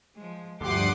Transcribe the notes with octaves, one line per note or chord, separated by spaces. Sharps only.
F3 G#3
D2 G2 F3 G4 F#5 C6 D6 D#6